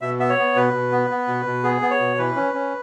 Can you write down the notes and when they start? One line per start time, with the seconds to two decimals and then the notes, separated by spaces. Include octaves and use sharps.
0.01 B2 E5
0.19 B3 E5
0.29 C#5
0.38 B3
0.56 B2 B4
0.73 B2
0.92 B3
1.10 B3
1.27 B2
1.46 B2
1.64 B3 G#4
1.82 B3
1.91 C#5
2.00 B2
2.18 E3 B4
2.36 C#4
2.54 C#4